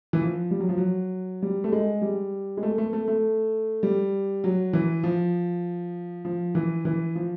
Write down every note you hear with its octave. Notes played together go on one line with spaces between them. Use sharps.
E3
F3
G3
F#3
F3
F#3
G3
A3
G#3
G3
G#3
A3
A3
A3
A3
G3
F#3
E3
F3
F3
E3
E3
F3